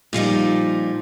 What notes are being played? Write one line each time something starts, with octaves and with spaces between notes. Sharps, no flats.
A#2 F3 G3 D#4